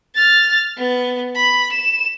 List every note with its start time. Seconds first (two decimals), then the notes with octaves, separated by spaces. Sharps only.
0.15 F6 A6
0.77 B3
1.36 B5
1.73 E7